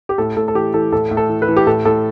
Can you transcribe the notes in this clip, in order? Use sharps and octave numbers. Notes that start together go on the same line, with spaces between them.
G4
A2 A4
A2 A4
A4
E3 G4
E3 A4
A2 A4
A2
A4
E3
B4
E3
G4
A2 A4
A2 A4